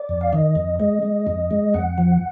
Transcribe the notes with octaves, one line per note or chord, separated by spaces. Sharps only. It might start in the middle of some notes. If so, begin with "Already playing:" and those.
Already playing: D5
F2
F5
D#3 D#5
F2
G#3 D#5
G#3
F2
G#3
F2 F#5
F3